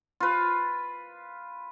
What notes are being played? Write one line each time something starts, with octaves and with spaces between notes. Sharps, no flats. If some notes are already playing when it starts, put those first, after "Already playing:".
F4 B4